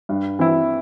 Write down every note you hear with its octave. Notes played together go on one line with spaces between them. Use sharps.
G2
E3 C4 E4